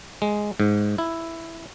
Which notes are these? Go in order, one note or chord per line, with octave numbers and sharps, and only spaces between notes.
G#3
G#2
E4